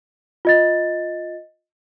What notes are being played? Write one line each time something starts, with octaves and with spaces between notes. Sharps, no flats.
F4 D#5 A6